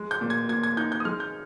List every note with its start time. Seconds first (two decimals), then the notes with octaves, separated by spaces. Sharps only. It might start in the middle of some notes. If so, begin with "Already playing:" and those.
Already playing: G#3
0.11 G6
0.21 A#2
0.30 G#6
0.49 A#2 G#6
0.63 G#6
0.77 D#4 G6
0.92 G6
1.00 D#6
1.05 G#3 F6
1.20 G6